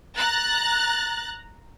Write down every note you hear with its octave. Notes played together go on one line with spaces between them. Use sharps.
A#5 F#6 A6